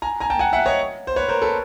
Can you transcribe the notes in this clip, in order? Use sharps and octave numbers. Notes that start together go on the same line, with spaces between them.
G#5 A#5
G#5 A#5
G5 A5
F#5 G#5
E5 F#5
C#5 D#5
C5
B4 C#5
A#4 C5
A4 B4